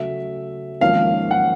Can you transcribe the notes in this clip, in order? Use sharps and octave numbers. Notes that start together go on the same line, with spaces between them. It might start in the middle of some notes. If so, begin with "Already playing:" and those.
Already playing: C#3 F#3 A3 E5
G#1 G#2 F3 A#3 C#4 F5
F#5